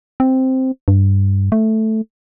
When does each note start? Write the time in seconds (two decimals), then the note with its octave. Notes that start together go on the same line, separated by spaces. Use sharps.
0.20 C4
0.88 G2
1.52 A3